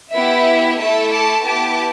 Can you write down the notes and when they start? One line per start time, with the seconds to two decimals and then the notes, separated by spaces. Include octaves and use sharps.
0.12 B3 E4 G4 E5
0.78 A3 E4 A4 E5 A5
1.11 A5 D6
1.43 B3 E4 G4 A5 D6